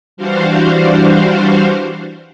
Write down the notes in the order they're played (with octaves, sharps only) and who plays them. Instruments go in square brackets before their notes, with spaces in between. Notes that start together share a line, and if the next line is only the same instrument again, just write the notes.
[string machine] E3 G3 D4 F#4 C5 F5